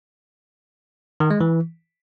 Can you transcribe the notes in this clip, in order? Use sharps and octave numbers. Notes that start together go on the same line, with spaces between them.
D#3
G#3
E3